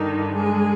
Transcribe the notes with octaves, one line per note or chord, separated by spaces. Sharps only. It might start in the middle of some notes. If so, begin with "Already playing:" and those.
Already playing: G2 D3 D#3 D#4
G#3 G#4